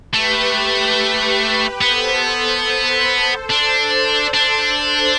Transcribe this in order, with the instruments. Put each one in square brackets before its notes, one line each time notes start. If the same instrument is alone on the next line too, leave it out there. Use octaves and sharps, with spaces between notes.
[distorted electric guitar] A3 [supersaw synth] G4 B4
[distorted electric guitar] B3 [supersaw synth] A4 C5
[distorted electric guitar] D4 [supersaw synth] A4 C5
[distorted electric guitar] D4